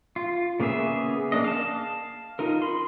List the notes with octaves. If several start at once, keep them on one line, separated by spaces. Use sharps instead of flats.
F4
C#3 A#3 B3 G#4 E5
A#3 D4 D#5
F5 A5
D#4 F4 A#4
B5 C6